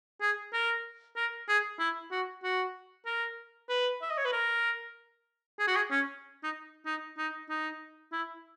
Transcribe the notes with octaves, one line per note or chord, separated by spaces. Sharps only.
G#4
A#4
A#4
G#4
E4
F#4
F#4
A#4
B4
E5
D#5
C#5
B4
A#4
G#4
F#4
G#4
C#4
D#4
D#4
D#4
D#4
E4